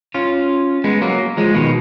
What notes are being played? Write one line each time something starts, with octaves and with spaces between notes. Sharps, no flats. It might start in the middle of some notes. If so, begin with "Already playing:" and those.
C#4 F4
G#3 B3
F#3 A#3
F3 G#3
B2 D#3